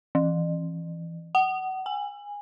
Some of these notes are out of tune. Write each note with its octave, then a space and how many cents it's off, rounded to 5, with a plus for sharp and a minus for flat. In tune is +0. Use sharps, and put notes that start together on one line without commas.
E3 +15
F#5 +30
G#5 -20